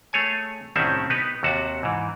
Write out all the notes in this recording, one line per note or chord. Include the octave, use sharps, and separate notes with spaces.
A3 G#4 C#5 G#5
C2 A2 D#3 C4 C#4 E5
B3 D#4 G4 B4
D#2 C3 F#4 A5
G#2 E3